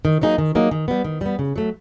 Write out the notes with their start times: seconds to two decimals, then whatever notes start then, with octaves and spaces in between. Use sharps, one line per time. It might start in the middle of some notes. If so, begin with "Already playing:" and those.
0.05 D#3
0.21 F#3 A#3 D#4 G#4
0.38 D#3
0.55 F#3 A#3 D#4 G#4
0.71 D#3
0.88 G3 B3
1.04 D#3
1.21 G3 B3
1.39 C#3
1.56 F#3 A3